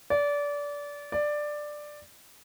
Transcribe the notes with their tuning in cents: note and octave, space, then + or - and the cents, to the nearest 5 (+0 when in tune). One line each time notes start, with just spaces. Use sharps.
D5 -25
D5 +10